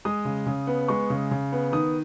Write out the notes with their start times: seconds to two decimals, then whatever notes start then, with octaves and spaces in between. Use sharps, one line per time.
0.05 G#3 D#6
0.25 C#3
0.46 C#3
0.67 B3
0.88 G#3 C#6
1.10 C#3
1.31 C#3
1.52 B3
1.72 D#3 D#6